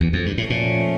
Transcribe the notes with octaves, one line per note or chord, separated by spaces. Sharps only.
E2
F2
G2
A2
A#2 F3 A3 C#4